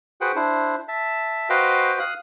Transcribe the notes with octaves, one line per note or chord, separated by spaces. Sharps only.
F#4 G#4 B4 C5 F#5 G5
D4 E4 C5
E5 A5
F#4 B4 C5 D#5 F5 G5
F5 D#6 F#6